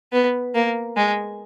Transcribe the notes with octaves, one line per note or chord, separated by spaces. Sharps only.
B3
A#3
G#3